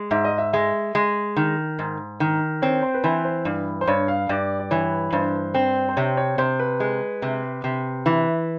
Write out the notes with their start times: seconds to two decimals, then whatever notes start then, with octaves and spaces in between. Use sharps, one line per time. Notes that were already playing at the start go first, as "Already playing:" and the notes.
Already playing: G#3
0.11 G#2 E5
0.25 D#5
0.38 E5
0.53 G#3 E5
0.95 G#3
1.36 D#3
1.79 G#2
2.20 D#3
2.62 C4 C#5
2.83 C5
2.94 B4
3.04 E3 C5
3.25 C5
3.45 G2
3.81 C5
3.87 G2 C#5
4.08 F5
4.29 G2 D5
4.59 D5
4.71 E3 C#5
5.12 G2 C5
5.54 C4
5.89 C5
5.97 C3 C#5
6.17 C#5
6.38 C3 C5
6.59 B4
6.80 G#3
7.22 C3
7.64 C3
8.06 E3